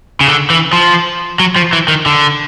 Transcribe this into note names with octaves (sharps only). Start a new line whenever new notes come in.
C#3
D3
E3
F3
F#3
F3
E3
D#3
D3